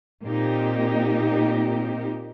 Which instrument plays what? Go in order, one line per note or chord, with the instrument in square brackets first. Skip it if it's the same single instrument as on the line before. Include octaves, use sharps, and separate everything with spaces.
[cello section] A#2 A#3 C4 D#4 G4